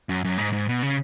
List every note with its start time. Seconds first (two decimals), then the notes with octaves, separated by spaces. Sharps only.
0.09 F#2
0.24 F#2
0.38 G#2
0.53 G#2
0.68 B2
0.82 C#3